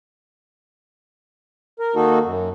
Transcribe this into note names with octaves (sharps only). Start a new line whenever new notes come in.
A#4
D#3 A#3 D#4 F#4 A4
F#2